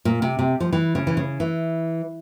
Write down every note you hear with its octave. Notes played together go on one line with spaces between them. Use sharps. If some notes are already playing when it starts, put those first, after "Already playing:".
A#2
C3
C3
F3
E3
C#3
E3
C#3
E3